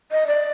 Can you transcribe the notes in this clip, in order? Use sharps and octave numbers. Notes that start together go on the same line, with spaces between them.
D#5
D5